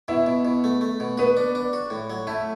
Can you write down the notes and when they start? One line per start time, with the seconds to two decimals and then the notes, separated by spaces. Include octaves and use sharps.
0.08 B2 E4
0.27 B2
0.45 B2
0.64 A3
0.81 A3
1.00 B2
1.18 B3 F#4
1.37 D4
1.55 D4
1.73 F#4
1.90 A2
2.10 F#3
2.27 A3 E4